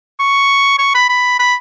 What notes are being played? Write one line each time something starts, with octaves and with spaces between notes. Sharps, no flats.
C#6
C#6
B5
B5
B5